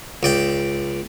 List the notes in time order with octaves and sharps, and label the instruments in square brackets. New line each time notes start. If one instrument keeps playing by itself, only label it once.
[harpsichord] C#2 D5 G5